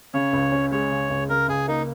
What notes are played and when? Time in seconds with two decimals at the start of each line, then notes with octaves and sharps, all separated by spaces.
0.14 C#3 C#5
0.33 C#2
0.52 C#4
0.71 G#3 C#5
0.91 C#3
1.10 C#2
1.29 C#3 A#4
1.48 C#2 G#4
1.68 A#3 D#4